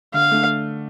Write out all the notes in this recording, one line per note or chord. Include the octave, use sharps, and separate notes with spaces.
D3 F5
A3 D4